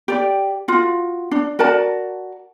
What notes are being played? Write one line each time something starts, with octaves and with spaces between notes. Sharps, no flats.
G4 D5
F4 F#4
D4
F#4 A#4 D5 A5